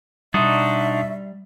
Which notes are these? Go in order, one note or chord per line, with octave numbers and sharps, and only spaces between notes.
B2 G3 D4 D#4 F#4 E5 C6 D#6